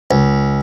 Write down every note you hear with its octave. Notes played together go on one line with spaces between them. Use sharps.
C#2